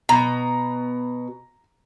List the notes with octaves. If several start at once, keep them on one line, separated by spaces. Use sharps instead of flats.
B2 A#5